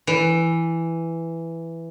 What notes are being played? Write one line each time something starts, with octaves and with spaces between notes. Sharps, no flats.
E3